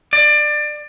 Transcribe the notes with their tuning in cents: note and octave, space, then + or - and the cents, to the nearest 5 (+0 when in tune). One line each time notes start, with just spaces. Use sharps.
D5 +25